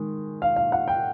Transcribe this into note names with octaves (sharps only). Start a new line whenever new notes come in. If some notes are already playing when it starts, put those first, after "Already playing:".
Already playing: D#3 G#3
F5
F5
F#5
G5